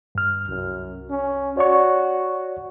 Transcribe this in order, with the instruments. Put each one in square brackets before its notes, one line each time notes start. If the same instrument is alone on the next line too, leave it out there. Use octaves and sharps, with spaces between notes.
[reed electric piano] G2 F6
[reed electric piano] C2 [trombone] F#2
[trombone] C#4
[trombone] F#4 [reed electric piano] C#5 D5 C#6